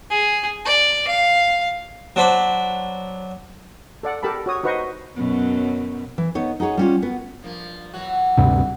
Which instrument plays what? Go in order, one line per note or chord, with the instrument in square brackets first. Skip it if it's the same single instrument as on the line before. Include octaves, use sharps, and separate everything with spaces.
[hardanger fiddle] G#4
D5
F5
[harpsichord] F#3 D4 C5 B5 D6
[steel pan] A4 D5 F#5
G4 A4 A#4 A5 B5
F#4 C#5 D#6
D#4 F#4 B4 C5 D#5 C#6
[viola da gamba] F#2 B2 F#3
[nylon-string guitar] E3
B3 D#4 C#5
D#4 F#4 G#4 C#5
G3 C#4 F4
B3 F#4
[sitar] G2 F3 A#3
E3 F#3 F#4
[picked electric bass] D2 G2 C3